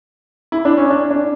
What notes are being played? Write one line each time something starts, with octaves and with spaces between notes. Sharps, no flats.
E4
D4
C#4
D4
D4